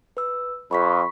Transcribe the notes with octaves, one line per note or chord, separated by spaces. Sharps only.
B4 E6
F2 B5 C#6 B6